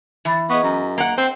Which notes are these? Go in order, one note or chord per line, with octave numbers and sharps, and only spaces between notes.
E3 E5 B5 A6
B3 G#4 D#5 C#6
F#2 A#5
A#3 F#5
C4 C5